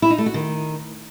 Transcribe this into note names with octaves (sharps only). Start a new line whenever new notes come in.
E4
D#4
A3
F#4
D#3